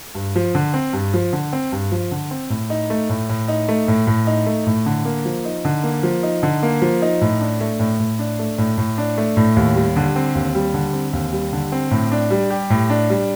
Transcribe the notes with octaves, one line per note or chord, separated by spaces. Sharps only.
G2
F3
D3
C4
G2
F3
D3
C4
G2
F3
D3
C4
A2
D#4
A3
A2
A2
D#4
A3
A2
A2
D#4
A3
A2
D3
A#3
F3
D#4
D3
A#3
F3
D#4
D3
A#3
F3
D#4
A2
D4
A3
A2
A2
D4
A3
A2
A2
D4
A3
A2
D#2
G3
D3
C4
D#2
G3
D3
C4
D#2
G3
D3
C4
A2
D4
G3
G4
A2
D4
G3